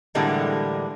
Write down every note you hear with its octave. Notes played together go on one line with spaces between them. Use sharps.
A2 D3 E3 G3 G#3 A#3